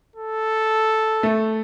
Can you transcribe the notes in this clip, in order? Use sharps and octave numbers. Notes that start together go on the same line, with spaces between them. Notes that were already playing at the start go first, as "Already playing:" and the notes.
A4
A3